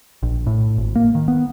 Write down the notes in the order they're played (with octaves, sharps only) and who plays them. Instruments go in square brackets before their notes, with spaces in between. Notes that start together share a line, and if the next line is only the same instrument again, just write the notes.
[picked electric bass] A#1
A2
G#1
A#3
D#3
B3